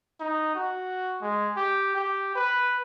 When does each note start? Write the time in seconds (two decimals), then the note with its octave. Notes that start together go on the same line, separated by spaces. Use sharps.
0.20 D#4
0.55 F#4
1.22 G#3
1.56 G4
1.96 G4
2.35 B4